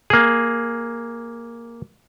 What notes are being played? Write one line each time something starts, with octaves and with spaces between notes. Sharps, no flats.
A#3 G#4